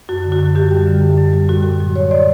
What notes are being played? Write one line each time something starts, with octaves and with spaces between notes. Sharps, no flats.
F#2 F#4
D3
F#4
F#2
F#2 G4
G3
D3
F#2
F#2
G3
A2 F#4
A2
F#3
A2 C#5
A2 D5